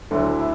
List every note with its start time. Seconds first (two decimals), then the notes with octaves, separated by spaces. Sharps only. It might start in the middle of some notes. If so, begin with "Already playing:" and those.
0.11 D2 D3 F#3 A3 E4
0.38 E4